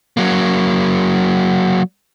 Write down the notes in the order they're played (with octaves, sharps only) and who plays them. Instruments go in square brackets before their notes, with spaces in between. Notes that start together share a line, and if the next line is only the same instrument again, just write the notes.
[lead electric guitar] F#3 A#3